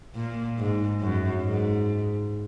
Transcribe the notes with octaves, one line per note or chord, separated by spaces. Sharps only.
A#2
G#2
F#2
G#2